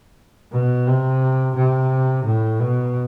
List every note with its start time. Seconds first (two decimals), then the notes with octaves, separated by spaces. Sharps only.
0.52 B2
0.87 C3
1.55 C3
2.24 A2
2.60 B2